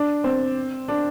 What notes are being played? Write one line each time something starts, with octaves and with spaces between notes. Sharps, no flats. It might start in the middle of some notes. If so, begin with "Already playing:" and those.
Already playing: D4
C4
D4